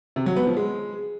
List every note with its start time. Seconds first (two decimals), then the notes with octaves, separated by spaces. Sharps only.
0.16 C3
0.26 F#3
0.36 B3
0.47 F3
0.57 G#3